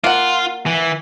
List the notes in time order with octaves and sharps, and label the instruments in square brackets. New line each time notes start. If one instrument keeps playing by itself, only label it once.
[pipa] A#3 F#5 [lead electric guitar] F4
[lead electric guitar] E3